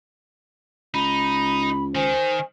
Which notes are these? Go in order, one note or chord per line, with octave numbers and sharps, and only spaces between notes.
C#2 D#4 B5
D#3 C5 G#5